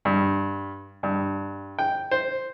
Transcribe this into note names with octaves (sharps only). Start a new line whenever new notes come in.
G2
G2
G5
C5